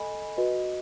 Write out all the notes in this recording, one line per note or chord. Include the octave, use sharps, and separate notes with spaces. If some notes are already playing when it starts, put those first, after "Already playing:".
Already playing: A4 D#5 G#5 B5
F#4 B4 D#5